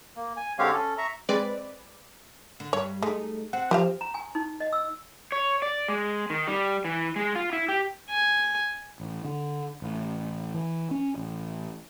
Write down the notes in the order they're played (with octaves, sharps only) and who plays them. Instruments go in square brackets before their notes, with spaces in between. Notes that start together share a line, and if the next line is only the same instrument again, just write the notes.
[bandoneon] A#3
G#5
D3 G#3 C4 G4 C#5 F5
C#4 A4
E5 A#5 C#6
[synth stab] G#3 C4 B4 D5
[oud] D3
[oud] G2 [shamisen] C#5
[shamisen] G#3 [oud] A3 D#4
[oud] C4 [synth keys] F#5
[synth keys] F3 [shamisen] G4 C5 F5
[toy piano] A#5
G#5
D#4
D#5
E6
[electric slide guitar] C#5
D5
G#3
D#3
G3
E3
G#3
F4
E4
G4
[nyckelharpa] G#5
[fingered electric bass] A1
D3
A1
E3
C#4
A1